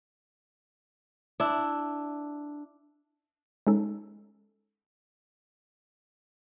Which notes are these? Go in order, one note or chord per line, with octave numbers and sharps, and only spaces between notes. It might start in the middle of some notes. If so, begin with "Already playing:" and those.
D4 E4
G#3 C#4 D#4 A4